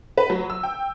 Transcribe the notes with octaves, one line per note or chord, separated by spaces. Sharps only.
B4
F#3
E6
G5